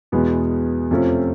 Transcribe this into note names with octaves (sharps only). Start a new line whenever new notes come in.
E2 B2 G#3 B3
F2 C3 F3 A3 C#4